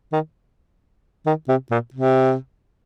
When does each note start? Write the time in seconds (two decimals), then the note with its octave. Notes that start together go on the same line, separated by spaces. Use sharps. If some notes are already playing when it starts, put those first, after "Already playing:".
0.13 D#3
1.26 D#3
1.49 C3
1.71 A#2
1.94 C3